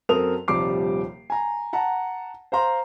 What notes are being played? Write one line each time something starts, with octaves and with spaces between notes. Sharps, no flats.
F#2 C4 A4 A#4 D#6 F7
D#1 C3 F3 G3 D6 C7
G#5 A#5
F#5 A5 A#5
C5 F5 A#5 C6